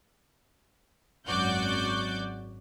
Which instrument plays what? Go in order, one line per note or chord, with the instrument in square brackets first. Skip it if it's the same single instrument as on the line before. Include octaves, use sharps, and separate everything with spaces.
[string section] G#1 F#2 F#4 D5 G6